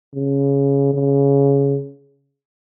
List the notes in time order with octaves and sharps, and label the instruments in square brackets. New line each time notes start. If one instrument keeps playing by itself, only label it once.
[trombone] C#3
C#3